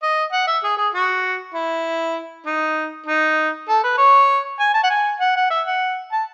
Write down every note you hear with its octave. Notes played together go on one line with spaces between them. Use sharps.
D#5
F#5
E5
G#4
G#4
F#4
E4
D#4
D#4
A4
B4
C#5
G#5
A5
F#5
G#5
F#5
F#5
E5
F#5
A5